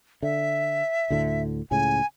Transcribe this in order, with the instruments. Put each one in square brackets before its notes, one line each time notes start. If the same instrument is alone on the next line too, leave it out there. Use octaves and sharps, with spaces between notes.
[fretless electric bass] D3 [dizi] E5
[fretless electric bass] D2 A2 D3
[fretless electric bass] C#2 A2 C#3 [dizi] G#5